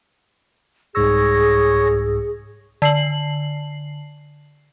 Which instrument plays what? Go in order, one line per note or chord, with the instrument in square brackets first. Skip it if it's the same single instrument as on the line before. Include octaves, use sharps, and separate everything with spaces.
[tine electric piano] C2 G#2 E6 [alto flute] G#4 [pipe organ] C#5 A#6
[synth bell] D3 C7 F#7